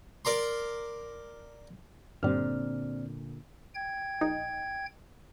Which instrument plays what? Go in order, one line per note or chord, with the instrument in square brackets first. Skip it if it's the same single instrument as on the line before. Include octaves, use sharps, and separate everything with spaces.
[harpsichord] A#4 D5 A#5 C6
[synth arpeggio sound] G2 G3 [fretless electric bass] A#2 D3 [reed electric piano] C4 D5 F6
[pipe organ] G5 G#6
[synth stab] A#1 D#4